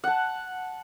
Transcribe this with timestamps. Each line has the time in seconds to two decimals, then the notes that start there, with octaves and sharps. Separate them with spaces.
0.04 F#5 A5